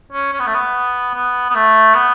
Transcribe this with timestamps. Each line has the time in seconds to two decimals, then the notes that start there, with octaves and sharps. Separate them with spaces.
0.12 C#4
0.33 C#4
0.39 B3
0.47 A3
0.54 B3
1.14 B3
1.49 B3
1.55 A3
1.94 B3